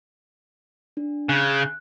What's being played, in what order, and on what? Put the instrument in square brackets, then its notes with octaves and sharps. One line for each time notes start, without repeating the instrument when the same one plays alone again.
[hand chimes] D4
[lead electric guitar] C#3 [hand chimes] F#6